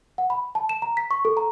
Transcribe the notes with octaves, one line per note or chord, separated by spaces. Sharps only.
F#5
B5
A5
E7
A#5
B6
C#6
A4
A#5